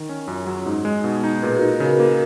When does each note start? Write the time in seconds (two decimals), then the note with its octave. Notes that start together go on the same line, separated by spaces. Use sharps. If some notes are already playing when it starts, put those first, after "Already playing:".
Already playing: D#3
0.09 C#4
0.28 F#2 F4
0.41 F4 G#4
0.47 F#3
0.53 C#4
0.66 G#2 D#4
0.85 G#3
1.04 B2
1.24 D#4
1.42 A#2 G#4 B4
1.55 F#4 A#4
1.61 D#4
1.68 F#4 A#4
1.80 C#3 F#4 A#4
2.00 A#3